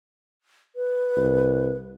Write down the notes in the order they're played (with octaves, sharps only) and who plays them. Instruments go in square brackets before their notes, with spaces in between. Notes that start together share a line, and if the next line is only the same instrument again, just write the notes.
[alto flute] B4
[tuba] C2